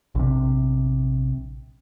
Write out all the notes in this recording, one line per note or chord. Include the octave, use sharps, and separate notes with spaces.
A#1 C3